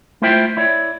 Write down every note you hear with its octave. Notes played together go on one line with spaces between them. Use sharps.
A3 E4 F4 C5 E5 G5
E4 C#5 D5